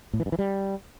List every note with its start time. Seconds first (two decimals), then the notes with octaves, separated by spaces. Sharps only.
0.13 A2
0.20 E3
0.26 G2
0.32 E3
0.39 G3